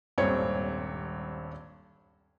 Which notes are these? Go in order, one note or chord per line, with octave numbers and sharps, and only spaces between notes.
D#1 G#1 G2 C4 C#5